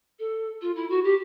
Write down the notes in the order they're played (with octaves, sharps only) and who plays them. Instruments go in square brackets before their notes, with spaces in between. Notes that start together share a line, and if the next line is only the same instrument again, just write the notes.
[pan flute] A4
F4
E4
F#4
G4